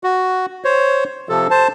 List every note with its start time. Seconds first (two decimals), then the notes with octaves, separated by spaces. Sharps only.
0.04 F#4
0.65 C5 C#5
1.29 C3 F3 A4
1.51 C5 A5